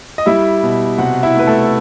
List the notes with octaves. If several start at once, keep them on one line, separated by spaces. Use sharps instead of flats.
D#5
G3 E4 E5
B2
C3 F#4 F#5
E4 E5
A3
B4
A3 A4